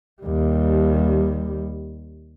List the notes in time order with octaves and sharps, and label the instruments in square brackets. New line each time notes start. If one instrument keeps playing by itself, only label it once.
[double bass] D#2 G3